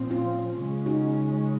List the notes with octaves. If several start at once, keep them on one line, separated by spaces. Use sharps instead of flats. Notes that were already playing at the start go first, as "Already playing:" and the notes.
Already playing: A#2 F3 C4
C#4 F4
C#3 G#3 C#4
D#4 F#4